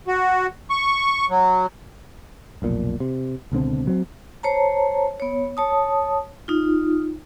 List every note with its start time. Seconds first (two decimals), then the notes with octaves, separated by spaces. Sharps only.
0.07 F#4
0.70 C#6
1.30 F#3
2.62 F1 B1 A#2
3.00 C3
3.52 C#2 B2 D3 C4
3.87 F#3 C4
4.43 C5 C#5 A5 A#5
5.20 B3 C#5
5.57 C#5 A5 D#6
6.48 D#4 F4